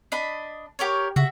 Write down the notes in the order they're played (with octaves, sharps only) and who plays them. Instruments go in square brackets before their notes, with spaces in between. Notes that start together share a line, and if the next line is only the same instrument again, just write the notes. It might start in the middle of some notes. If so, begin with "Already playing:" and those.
[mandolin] D4 D#5 B5
G4 A#4 C#5
[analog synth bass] C#3 [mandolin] F#4 E5